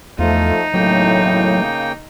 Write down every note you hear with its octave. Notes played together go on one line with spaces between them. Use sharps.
E2 F3 A3 D#4 F4
B1 E2 A2 C#3 F#3 A#3 G5